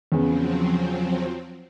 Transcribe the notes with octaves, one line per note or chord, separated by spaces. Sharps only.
E2 C#3 F3 F#3 B3 C4